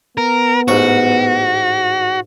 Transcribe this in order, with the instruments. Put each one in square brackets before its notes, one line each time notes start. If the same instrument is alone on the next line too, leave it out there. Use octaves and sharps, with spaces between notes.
[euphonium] B3 [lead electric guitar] A#4
[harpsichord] A1 G#2 C#6 [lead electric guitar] F#4